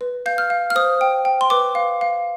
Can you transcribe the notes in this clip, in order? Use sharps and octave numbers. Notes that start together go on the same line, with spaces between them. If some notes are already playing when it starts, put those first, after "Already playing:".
B4
F5 G6
F6
F5
F6
C5 D#6
G5
G5
C6
B4 D6
F5
F5